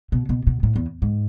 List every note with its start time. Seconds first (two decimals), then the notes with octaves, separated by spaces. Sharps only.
0.12 B2
0.29 B2
0.47 B2
0.63 A2
0.76 E2
1.02 G#2